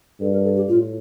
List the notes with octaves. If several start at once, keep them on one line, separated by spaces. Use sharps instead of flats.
G2 A4
A#4
A4
G4
A2 F4